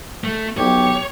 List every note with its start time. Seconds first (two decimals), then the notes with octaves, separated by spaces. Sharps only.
0.24 A3
0.58 B1 G4 C#5